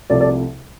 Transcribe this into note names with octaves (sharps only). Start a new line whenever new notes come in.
C2 C3 F3 A3 A4 D5
A4 D5